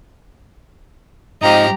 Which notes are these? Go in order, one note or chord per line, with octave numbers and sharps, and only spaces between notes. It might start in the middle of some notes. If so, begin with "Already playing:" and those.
G#2 C3 F3 D#4 G4 D#5 A#5